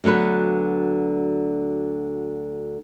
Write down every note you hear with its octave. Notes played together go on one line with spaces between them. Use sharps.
D2 D3 F#3 B3 B4